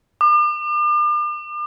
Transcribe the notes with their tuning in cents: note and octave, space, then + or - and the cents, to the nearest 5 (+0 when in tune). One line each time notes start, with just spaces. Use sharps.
D6 +40